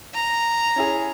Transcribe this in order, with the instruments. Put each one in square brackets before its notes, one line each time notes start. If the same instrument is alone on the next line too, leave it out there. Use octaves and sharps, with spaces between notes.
[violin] A#5
[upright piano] C#4 E4 G#4